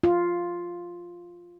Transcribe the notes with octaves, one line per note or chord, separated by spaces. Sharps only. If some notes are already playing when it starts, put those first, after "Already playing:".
F4